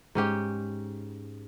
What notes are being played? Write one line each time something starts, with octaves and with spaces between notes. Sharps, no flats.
G#2 C#4 G4 G5